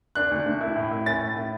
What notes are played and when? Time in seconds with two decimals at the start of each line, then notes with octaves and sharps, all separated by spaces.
0.15 D4 F#6
0.31 D2
0.46 D2
0.61 E4
0.76 A2
0.91 E4
1.06 C#4 A6
1.21 A2
1.36 E4